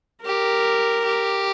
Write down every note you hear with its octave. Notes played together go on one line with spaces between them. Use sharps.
G4 A#4
G4